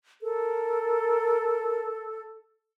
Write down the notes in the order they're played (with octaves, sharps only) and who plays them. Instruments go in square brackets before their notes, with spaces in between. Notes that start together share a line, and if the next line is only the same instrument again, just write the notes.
[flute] A4 [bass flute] A#4